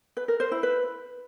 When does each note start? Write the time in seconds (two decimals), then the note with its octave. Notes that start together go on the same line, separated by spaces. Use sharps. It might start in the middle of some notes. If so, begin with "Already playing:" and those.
0.17 B4
0.28 A#4
0.40 C5
0.51 E4
0.63 B4